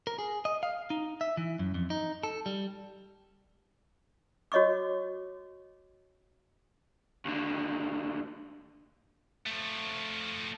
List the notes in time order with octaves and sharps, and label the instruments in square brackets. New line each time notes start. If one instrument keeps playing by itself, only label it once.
[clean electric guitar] A#4
G#4
D#5
F5
D#4
E5
E3
F#2
F2
D#4
A4
G3
[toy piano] F#4 C#5 D#5 C#6 D6
[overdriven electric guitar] D#2 D3
[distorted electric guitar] F3 A3